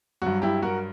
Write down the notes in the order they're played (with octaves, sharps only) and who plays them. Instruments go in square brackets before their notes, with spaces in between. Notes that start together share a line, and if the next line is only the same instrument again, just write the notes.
[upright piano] G2 F#3 F#4
E4 G4
F#4 A#4